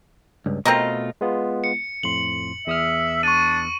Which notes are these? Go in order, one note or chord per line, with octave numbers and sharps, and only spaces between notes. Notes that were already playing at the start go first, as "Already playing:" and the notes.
C#2 G2
B2 A3 C4 F4 A#4 D#5
G#3 B3 F4
C#7
F2 A2 C6 F#7
E2 E5 D#6 F6
D4 C#6 D#7